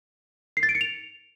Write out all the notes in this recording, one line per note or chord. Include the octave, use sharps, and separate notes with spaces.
C7
A6
D7
C#7
F7